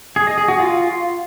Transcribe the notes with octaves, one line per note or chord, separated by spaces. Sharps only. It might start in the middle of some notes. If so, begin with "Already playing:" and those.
G#4
D#5
G#4
F#4
F4